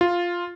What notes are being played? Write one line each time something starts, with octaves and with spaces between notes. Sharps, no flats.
F4